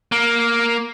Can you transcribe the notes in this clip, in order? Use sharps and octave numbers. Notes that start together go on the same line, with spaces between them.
A#3